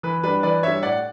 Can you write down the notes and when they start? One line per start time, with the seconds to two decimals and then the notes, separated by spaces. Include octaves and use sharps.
0.03 E3 B4
0.23 G3 D4 B4
0.43 E3 B4 D5
0.63 G3 D4 C#5 E5
0.83 A2 D5 F#5